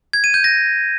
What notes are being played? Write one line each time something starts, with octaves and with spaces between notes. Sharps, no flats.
G#6
D#7
G6
A#6